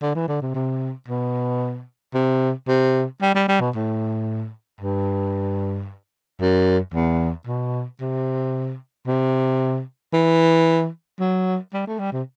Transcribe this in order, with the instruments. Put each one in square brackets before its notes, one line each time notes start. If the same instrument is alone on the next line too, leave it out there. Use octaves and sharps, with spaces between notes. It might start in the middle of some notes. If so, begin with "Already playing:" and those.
[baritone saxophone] D3
E3
D3
C3
C3
B2
C3
C3
G3
G3
G3
B2
A2
G2
F#2
E2
B2
C3
C3
E3
F#3
G3
A3
G3
C3